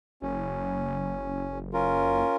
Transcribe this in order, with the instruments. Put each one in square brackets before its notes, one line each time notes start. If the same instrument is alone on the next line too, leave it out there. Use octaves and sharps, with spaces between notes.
[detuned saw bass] F#1 [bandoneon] C#4
[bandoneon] C#4 F4 A#4